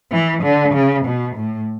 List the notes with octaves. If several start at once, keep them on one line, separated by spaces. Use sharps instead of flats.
E3
D3
C#3
B2
A2